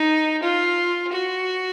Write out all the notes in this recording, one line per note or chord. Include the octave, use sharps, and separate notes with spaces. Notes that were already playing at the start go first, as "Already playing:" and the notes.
Already playing: D#4
F4
F#4